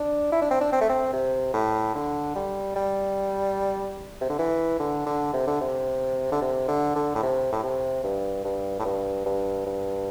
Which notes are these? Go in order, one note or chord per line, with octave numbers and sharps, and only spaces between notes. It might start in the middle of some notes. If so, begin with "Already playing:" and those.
Already playing: D4
E4
D4
C4
D4
C4
A3
C4
C3
A2
D3
G3
G3
C3
D3
E3
D3
D3
C3
D3
C3
D3
C3
D3
D3
A2
C3
A2
C3
G2
G2
A2
G2
G2
G2